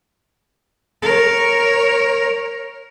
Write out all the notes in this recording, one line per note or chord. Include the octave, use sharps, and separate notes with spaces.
A#4 C#5